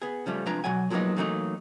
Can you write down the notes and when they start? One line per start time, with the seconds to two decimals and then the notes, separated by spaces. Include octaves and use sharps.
0.02 B3 G#4
0.26 C#3 F3 G3 A3
0.46 C2 F3 G#3 D4 B4 A#5
0.64 B2 F#3 F#5 G#5
0.90 F3 F#3 G#3 A#3 B3 D#4
1.16 E3 F#3 A3 A#3 D4 D#4